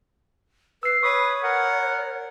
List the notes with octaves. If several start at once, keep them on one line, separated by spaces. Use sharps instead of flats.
B4 E6 C7
B4 C#5 C#6 D#6 B6
A#4 F#5